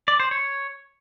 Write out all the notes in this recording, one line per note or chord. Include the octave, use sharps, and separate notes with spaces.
D5
C5
C#5